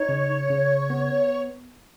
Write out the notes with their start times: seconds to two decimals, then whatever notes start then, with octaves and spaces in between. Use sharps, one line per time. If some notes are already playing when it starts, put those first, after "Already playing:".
Already playing: D#4 C#5
0.09 C#3
0.50 C#3
0.90 B3